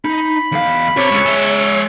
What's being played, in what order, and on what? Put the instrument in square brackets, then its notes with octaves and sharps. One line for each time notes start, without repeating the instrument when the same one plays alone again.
[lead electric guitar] D#4 [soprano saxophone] B5
[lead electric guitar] E2 F5
[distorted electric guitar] C3 [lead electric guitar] C#5
[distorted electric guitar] C#2
G#3 E5